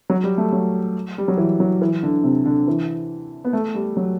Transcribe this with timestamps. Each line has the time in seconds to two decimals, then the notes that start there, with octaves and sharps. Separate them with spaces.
0.10 F#3
0.24 G3
0.38 A3
0.52 F#3
1.18 G3
1.28 F#3
1.37 E3
1.60 F#3
1.81 E3
2.03 D3
2.24 C3
2.46 D3
2.68 E3
3.45 B3
3.53 A3
3.75 G3
3.97 F#3